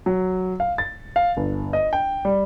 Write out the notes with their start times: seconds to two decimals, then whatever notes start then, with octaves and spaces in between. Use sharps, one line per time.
0.06 F#3
0.60 F5
0.78 A6
1.16 F5
1.37 G1
1.73 D#5
1.93 G5
2.25 G3